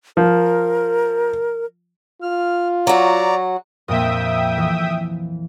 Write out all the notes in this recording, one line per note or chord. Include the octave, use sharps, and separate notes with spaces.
F3 A#4
F4 F6
F#3 F#4 D5 A#5
F2 A#2 A#3 E5 G5 D#6
E3